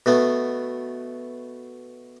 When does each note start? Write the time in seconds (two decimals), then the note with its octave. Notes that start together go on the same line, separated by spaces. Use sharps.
0.06 B2 A3 B3